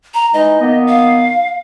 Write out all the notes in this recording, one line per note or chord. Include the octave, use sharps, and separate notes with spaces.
A#5
E3 G#3 D#4 D#5
D#3 A#3 B3
F5